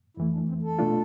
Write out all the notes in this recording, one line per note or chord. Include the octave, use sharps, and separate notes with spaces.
F2 E3 A3 E4
D4
C4
A4
B2 A3 D4 F4